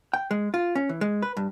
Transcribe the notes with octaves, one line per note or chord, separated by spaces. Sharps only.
G5
G#3
F4
C#4
E3
G#3
B4
G2